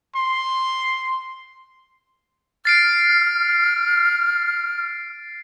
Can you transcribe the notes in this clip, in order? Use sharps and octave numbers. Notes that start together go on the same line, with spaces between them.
C6
F6 A6 C7 D7